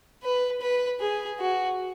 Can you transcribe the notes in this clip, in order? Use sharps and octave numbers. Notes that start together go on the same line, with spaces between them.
B4
B4
G#4
F#4